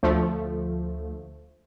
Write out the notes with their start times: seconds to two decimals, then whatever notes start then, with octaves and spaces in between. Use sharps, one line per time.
0.03 D2 F3 A3